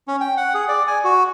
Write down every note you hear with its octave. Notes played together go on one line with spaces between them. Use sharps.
C#4
G5
F#5
G#4
D5
G#5
F#4